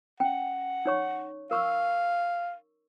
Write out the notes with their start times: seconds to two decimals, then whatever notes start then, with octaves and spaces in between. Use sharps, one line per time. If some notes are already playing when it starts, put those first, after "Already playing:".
0.20 C#4 F#5 G5
0.86 D#4 C#5 C#6
1.51 A#4 F5 C#6 E6